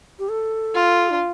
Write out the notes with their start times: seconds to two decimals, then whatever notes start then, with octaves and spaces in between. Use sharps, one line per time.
0.19 G4
0.29 A4
0.75 F4
1.10 D4